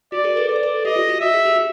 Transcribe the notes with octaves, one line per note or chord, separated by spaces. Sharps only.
F#4 D5
G#4 A#4
A4 B4
B4 D5
C5
A4 B4
G4 A4 D#5
F4 G4
F#4
F#4 E5
G#4
G4
F#4